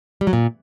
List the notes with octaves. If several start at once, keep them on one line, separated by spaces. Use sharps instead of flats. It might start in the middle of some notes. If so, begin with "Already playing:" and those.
G3
F#3
A#2